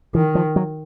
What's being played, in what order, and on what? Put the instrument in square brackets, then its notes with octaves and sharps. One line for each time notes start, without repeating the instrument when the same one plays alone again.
[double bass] D#3 [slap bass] E3
[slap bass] F3
F#3